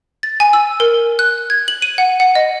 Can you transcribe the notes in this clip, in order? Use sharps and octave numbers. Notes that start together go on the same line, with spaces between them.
A6
G#5
E6
A#4
F#6
G#6
F#7
D#7
F#5
F#5
D#5